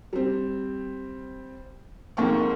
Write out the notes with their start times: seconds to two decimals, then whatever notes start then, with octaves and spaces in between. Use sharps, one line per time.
0.13 G3 C4
2.17 F2 G#2 A#3 G5 C#6